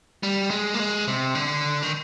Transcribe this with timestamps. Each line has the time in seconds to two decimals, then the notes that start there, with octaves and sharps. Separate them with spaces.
0.23 G3
0.50 G#3
0.74 A#3
0.79 G#3
1.08 C3
1.35 D3
1.82 D#3